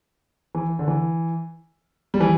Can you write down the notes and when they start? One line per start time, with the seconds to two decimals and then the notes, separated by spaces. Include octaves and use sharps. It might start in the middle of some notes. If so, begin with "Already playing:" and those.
0.55 E3
0.79 D3
0.88 E3
2.14 G3
2.20 E3